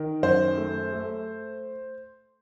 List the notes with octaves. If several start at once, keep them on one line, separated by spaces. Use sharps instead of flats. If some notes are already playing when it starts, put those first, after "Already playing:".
Already playing: D#3
F#2 C5
A3
A3